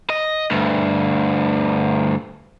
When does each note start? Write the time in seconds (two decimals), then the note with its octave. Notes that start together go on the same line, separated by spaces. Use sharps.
0.10 D#5
0.51 D2 G2